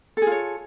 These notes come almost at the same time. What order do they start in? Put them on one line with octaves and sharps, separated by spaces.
A4 G#4 F4 C#5